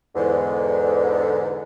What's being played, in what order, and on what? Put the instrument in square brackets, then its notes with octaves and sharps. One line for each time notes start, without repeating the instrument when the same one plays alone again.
[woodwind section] E2 G#2 D3